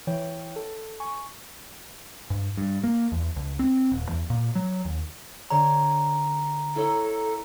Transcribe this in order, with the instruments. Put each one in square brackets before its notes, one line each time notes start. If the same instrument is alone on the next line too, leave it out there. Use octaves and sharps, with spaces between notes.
[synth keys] E3 C#5 G5
A4
G#5 C#6
[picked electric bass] G2
G2
A#3
E2
C#2
C4
D#1
E2
A#2
F#3
D#2
[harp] D3 C#5 [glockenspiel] A#5
[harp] E4 C#5 A#5 [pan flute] A4